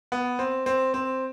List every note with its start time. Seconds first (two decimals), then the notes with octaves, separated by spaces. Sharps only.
0.12 B3
0.39 C4
0.66 C4
0.94 C4